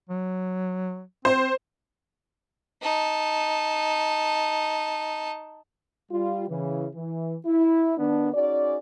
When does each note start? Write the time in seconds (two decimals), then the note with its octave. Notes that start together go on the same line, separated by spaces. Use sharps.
0.09 F#3
1.25 C4 C5
2.83 D#4 A5
6.11 G3 F4
6.49 C#3 E3
6.94 E3
7.46 E4
7.98 D#3 B3 D4
8.34 C#4 D#4 F#4 G#4 D5